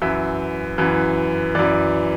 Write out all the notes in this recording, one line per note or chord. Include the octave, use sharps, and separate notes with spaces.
F#2 E3 E5
F#2 E3
F#2 E3 D5